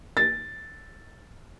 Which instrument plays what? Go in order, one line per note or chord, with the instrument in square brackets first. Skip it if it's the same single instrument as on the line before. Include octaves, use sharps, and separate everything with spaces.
[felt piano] A6